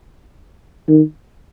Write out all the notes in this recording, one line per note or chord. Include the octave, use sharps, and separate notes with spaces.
D#3